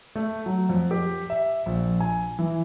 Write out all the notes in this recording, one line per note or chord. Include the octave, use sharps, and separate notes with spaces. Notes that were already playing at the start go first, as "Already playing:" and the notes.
A3
F#3
F2
G4
E5
A#1
G#5
E3